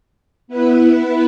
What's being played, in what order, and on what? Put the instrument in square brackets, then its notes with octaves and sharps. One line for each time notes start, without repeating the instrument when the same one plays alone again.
[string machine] B3 E4 B4